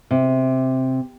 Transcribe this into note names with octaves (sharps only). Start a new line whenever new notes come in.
C3